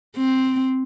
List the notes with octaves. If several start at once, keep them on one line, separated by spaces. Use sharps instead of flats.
C4